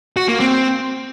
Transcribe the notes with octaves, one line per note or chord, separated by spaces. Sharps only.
F#4
A#3
C4